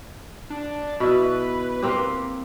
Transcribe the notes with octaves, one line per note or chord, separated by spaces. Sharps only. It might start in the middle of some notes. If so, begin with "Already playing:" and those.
D4
B2 E4 B4
A#3 C4 G4